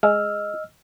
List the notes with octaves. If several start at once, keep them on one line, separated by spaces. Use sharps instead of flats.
G#3 D#5 E6 F6